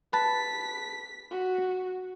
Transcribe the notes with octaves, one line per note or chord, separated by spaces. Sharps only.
B4 A5 B6
F#4